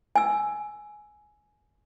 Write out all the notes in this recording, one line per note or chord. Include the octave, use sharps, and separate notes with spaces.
G#5 E6